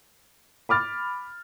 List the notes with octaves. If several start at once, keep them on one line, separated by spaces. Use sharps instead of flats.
B5 D6 F6 A6